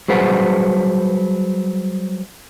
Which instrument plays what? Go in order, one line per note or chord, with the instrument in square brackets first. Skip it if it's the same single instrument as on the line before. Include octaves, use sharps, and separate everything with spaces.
[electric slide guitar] F#3 G3 G#4 B4 C5 F#5